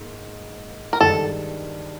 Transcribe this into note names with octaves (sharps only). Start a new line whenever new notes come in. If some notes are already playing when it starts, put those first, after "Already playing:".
Already playing: G#2 A#3
A#4
G2 D#3 G#3 A4